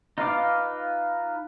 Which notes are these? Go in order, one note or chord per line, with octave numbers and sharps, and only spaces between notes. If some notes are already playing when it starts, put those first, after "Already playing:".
D#4 F4 B4 F5 D6